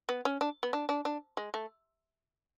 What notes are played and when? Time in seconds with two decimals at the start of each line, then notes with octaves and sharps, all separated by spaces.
0.09 B3
0.25 C#4
0.41 D4
0.63 B3
0.73 D4
0.89 D4
1.05 D4
1.37 G#3
1.54 A3